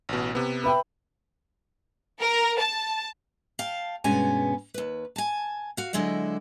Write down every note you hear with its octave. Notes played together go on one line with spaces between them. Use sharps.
A1 B2
C3 B3
B4 E5 G5 B5
A#4
A5
F5 G5 A5
G2 B2 G#3 B3 C#4 G#5
D#2 B4
G#5 A5
F#4 F5
D3 F#3 G#3 E4 D#5